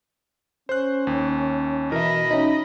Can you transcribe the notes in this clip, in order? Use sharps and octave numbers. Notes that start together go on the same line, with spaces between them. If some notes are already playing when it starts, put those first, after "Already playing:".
C#4 C5 F#6
D#2
B2 E3 A#4 D#5 E5 B5
C#4 D#4